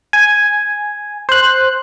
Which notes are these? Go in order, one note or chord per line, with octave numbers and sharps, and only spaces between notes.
G#5
C5 F#6